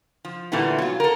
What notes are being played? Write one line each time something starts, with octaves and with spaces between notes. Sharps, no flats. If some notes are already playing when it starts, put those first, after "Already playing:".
F3
A#2 D3 E3 G3 A3 B3
F#3 F4
A4 A#4